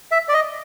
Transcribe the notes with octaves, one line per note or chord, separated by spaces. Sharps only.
E5
D5
D#5